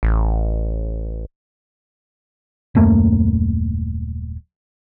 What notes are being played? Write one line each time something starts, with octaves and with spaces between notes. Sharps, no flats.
A1
D#1 F#2 A3 A#3